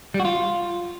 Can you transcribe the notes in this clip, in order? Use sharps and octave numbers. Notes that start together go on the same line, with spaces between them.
G3
F#4
F4